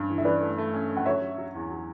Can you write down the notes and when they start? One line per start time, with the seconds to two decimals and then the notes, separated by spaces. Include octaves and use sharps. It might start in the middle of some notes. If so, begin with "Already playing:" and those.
Already playing: G2 C#4
0.10 E3
0.18 E5
0.25 C#4 B4 D5
0.41 A3
0.58 A3
0.73 C#4
0.89 C#4
0.97 F#5
1.06 F#3 C#5 E5
1.22 F#3
1.38 F#3
1.55 E2
1.71 F#3